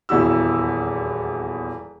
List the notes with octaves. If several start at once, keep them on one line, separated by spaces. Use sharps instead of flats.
D#1 E2 E4 F#4 E6